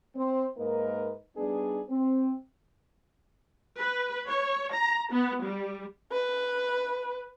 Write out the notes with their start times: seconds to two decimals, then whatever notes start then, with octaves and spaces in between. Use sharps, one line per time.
0.16 C4 C5
0.57 G#2 A#3 D#4 A#4 B4 D#5
1.37 G3 B3 D4 D#4 G#4
1.90 C4
3.80 B4
4.27 C#5
4.73 A#5
5.12 B3
5.43 G3
6.12 B4